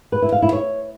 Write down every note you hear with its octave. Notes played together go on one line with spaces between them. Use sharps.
B4
E4
F5
E4
C#5